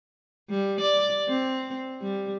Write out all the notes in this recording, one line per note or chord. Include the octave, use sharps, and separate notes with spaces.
G3
D5
C4
G3